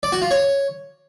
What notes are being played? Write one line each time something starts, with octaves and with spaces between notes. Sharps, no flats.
D5
F#4
F4
C#5